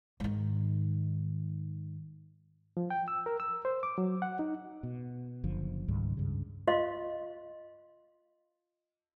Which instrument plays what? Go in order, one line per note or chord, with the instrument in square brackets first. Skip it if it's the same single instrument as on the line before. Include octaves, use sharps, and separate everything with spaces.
[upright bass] G#2 D#3
[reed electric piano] F3
G5
E6
A#4
E6
C5
D6
F#3
F#5
D#4
[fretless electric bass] B2
F#1 D3 F3
C#2 G#2 D#3 G3
C#2 G2 C#3
[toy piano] F4 D#5 F5 C6